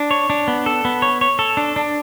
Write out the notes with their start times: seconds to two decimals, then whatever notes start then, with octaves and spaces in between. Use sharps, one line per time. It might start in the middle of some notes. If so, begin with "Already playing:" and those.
Already playing: D4
0.11 C#5
0.30 D4
0.48 B3
0.66 A4
0.85 B3
1.02 C#5
1.21 C#5
1.39 A4
1.57 D4
1.76 D4